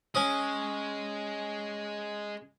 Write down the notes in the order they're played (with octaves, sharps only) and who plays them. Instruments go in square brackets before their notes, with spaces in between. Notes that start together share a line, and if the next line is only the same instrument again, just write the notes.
[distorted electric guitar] G#3 [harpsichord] C#4 D#6